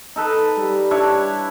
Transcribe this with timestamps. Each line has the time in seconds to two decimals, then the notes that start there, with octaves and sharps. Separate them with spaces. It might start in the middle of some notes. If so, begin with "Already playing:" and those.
0.16 D#4 A4 B4
0.58 G3
0.91 D4 E4 C#5